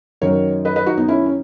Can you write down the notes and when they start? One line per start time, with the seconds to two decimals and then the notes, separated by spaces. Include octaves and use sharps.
0.21 F#2 D#3 F#3 A#4 C#5
0.65 B4 D#5
0.76 B4 D#5
0.86 D#4 F#4
0.97 B3 D#4
1.08 C#4 E4
1.26 C#4